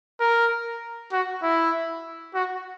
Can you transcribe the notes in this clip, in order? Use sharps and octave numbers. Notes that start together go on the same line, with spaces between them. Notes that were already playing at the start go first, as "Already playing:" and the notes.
A#4
F#4
E4
F#4